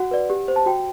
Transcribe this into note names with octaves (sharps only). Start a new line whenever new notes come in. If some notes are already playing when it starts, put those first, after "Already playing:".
Already playing: F#4 F#5
B4 D5
G4
C5
A5
F#4 G5